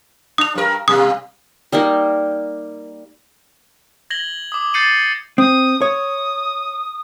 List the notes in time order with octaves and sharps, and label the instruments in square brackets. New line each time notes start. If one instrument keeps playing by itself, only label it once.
[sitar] D4 [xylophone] D#6 F7
[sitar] G2 A#4
[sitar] B2 G3 A#3 [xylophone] D#6
[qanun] G3 A#3 D#4 A#4
[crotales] G#6 A#6 F#7 G7
D6 D#6
G6 A6 C7 C#7 D#7 F#7
[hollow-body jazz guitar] C4 [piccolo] D#6
[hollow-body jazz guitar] C#5 [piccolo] D#6